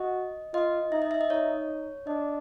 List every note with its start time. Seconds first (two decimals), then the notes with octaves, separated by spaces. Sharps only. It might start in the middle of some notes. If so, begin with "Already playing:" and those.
Already playing: F#4 D#5
0.53 F4 D#5
0.91 D#4 E5
1.02 D#5
1.11 E5
1.21 D#5
1.30 D#4 C#5
2.06 D4 D#5